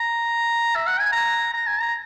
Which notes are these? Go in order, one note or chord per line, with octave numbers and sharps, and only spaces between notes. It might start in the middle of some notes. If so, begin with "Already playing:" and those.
Already playing: A#5
E5
F#5
G#5
A#5
A#5
G#5
A#5